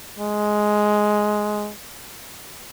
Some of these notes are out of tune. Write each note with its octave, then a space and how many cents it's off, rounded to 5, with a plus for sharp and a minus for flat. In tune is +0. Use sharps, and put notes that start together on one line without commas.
G#3 +10